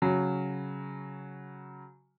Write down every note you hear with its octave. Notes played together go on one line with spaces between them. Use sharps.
C#3 F#3